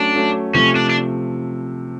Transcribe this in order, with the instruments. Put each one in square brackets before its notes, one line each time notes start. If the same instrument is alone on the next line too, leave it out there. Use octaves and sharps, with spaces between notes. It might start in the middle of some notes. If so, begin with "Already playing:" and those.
Already playing: [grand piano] F#3 A3 C#4 [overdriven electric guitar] D4
[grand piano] F#3 A3 C#4
[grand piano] C3 F3 A3 [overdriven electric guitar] C#4
[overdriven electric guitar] D4
D4